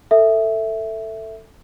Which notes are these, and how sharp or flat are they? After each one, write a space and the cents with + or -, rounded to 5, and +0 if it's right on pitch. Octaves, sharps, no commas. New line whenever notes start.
A4 +15 E5 +0